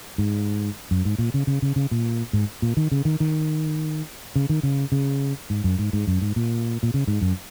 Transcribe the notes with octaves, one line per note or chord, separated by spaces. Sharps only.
G#2
F#2
G#2
A#2
C#3
C#3
C#3
C#3
A#2
G#2
A#2
D#3
C#3
D#3
D#3
C#3
D#3
C#3
C#3
G#2
F#2
G#2
G#2
F#2
G#2
A#2
A#2
C#3
G#2
F#2